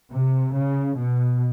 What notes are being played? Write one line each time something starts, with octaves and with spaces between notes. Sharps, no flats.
C3
C#3
B2